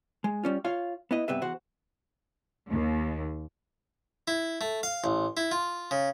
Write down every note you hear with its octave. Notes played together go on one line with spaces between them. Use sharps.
G#3
G3 C#4 F4
F4 C#5 F5
B3 E4 D#5
G2 C3 B3 B4 E5
E2 F#4 C5 F#5
D#2
E4
A3
F5
A1
E4
F4
C#3